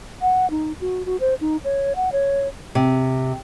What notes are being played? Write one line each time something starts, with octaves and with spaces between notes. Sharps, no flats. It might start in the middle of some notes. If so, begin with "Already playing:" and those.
F#5
D#4
F#4
F#4
C5
D#4
C#5
F#5
C#5
C3